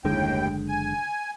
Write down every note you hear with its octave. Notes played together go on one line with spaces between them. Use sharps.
F#1 D#2 A2 D3 G#3 G5
G#5